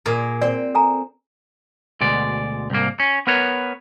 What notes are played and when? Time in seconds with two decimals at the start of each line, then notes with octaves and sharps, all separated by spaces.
0.06 A#2 G#4 A#4
0.42 C4 D5 G5
0.75 A4 G#5 A#5
2.01 D2 B2 G#3 D5
2.70 C2 G#2 A#3
3.00 C#4
3.27 B3 A#4 B4 C#5